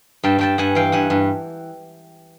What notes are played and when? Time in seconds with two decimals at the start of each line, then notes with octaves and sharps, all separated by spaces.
0.24 G2 G5 A5
0.39 G2 G5 A5
0.58 G2 F#5 G#5
0.75 E3 F5 G5
0.92 G2 F#5 G#5
1.10 G2